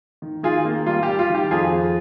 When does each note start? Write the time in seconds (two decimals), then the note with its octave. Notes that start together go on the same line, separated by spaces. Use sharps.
0.22 D#3
0.43 D#3 F4 G#4
0.65 A#3
0.86 G3 F4
1.03 G4
1.08 G3
1.19 F4
1.29 D#3
1.35 G4
1.51 F2 F4 G#4
1.72 F2